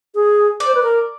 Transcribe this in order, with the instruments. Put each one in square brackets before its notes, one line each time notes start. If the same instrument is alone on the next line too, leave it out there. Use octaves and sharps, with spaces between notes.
[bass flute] G#4
[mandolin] D5
[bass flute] C5
B4
A#4